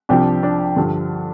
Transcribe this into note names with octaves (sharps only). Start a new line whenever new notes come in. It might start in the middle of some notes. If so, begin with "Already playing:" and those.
C2 C3 F3 D4 G4
D4
G2 D3 F3